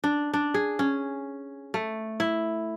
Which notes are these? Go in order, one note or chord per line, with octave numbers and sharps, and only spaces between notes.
D4
D4
G#4
C#4
A3
E4